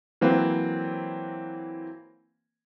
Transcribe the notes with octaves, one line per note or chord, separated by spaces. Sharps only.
E3 F#3 A#3 C4 B4